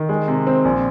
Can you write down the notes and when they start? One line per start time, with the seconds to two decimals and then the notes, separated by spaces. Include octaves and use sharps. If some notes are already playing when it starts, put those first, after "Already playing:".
Already playing: D#3
0.09 G#3
0.28 C3
0.47 C4
0.65 A#1